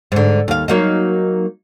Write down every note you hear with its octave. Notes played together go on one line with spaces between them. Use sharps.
G#2 D3
D#2 F5
F#3 A#3 D#4